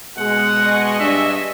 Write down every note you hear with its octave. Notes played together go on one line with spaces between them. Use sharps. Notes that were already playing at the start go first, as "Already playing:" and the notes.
B2 G#3 F#5
D#5 G#5 C#6
G2 D4 E5